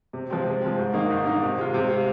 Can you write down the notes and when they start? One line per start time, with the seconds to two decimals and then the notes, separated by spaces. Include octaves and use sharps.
0.13 C3
0.30 F3 G#3 C4
0.46 C3
0.62 F3 G#3 C4
0.78 G#2
0.94 D#3 A#3 D#4
1.10 G#2
1.26 D#3 A#3 D#4
1.42 C3
1.58 G#3 F4
1.74 C3
1.90 G#3 F4